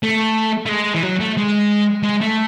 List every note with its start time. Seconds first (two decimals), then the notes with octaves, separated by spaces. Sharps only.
0.03 A3
0.66 A3
0.69 G#3
0.94 E3
1.03 F#3
1.20 A3
1.37 G#3
2.03 G#3
2.21 A3